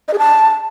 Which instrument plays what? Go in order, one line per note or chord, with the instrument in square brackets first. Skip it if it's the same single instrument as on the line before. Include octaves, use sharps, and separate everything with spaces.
[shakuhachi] D#5
G#4
A5